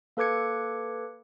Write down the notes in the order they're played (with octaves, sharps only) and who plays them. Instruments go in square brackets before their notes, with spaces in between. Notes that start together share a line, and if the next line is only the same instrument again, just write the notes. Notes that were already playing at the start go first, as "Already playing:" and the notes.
[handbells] A#3 A4 B4 D6 G#6 C#7